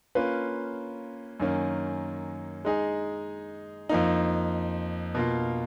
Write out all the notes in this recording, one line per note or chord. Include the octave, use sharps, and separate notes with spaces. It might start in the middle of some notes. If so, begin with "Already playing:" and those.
A#3 C#4 F4 B4
F#2 D#3 A#3 C#4
G#3 D#4 G#4
F2 F3 A#3 D#4
B2 A#3 F4